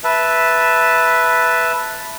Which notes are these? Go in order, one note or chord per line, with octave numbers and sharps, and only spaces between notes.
B4 E5 A5